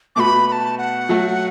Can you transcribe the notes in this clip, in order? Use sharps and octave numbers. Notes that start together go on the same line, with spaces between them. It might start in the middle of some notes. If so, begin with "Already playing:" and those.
B2 A3 F#4 B4 B5 D6
B5
A5
F#5
F#3 A3 F#4